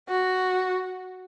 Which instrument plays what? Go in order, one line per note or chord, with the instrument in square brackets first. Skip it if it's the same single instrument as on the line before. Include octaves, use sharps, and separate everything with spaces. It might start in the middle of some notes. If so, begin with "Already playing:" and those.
[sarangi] F#4